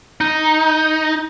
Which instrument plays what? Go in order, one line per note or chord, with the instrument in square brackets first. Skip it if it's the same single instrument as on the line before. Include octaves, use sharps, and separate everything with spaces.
[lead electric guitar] D#4